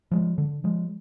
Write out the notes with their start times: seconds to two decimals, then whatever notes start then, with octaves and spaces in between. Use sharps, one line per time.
0.12 F3 G#3
0.38 D3
0.64 F3 G#3